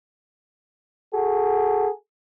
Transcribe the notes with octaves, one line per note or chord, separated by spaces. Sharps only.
F#4 G#4 A4